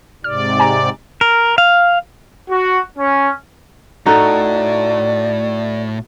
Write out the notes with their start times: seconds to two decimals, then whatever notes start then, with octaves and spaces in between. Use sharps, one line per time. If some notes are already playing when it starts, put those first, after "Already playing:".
0.24 G#2 C3 D5 F6
0.60 G#5 A#5
1.21 A#4
1.58 F5
2.50 F#4
2.97 C#4
4.06 A2 D#4 F#4 A4 D5